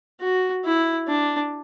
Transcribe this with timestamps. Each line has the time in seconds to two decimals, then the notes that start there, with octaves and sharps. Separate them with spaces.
0.21 F#4
0.64 E4
1.08 D4